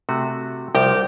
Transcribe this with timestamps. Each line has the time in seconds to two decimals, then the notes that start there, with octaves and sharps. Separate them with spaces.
0.09 C3 A3 F#4
0.75 C2 F3 G4